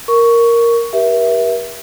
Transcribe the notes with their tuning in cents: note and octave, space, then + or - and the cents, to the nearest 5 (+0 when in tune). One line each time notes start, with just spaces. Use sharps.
A#4 +0 C#6 +10
G4 +0 A#4 +45 E5 +0